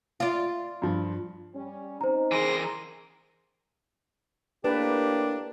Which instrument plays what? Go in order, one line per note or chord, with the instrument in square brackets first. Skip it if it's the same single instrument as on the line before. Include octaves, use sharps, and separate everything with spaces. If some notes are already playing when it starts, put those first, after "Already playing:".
[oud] F4 D5
[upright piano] G2 F3
[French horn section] G3 C#4
[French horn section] C4 C#4 D#4 [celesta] C5 A#5
[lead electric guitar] E3 A#4 [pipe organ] G#4 C6 A#6
[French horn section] A2 A#3 [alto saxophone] D4 [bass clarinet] G4 [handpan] B4